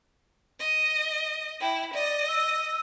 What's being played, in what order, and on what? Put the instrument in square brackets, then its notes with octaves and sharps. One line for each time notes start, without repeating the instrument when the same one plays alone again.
[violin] D#5
[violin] E4 [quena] G5
[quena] D5 [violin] D#5
[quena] E6